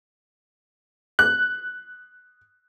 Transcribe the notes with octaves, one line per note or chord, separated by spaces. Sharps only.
F#6